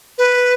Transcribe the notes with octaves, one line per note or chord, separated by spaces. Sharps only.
B4